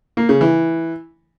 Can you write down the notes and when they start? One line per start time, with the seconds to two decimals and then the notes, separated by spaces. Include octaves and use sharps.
0.17 A#3
0.29 C#3
0.41 E3